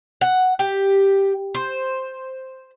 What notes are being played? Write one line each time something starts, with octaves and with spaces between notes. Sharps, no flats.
F#5
G4
C5